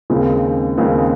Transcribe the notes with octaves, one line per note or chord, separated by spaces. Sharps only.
D#2 C#3 G#3 C4
D#2 C#3 G#3 C4